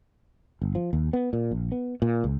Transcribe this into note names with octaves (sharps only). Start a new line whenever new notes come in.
G1
F3
D#2
B3
A#2
A#1
B3
A#2
C#2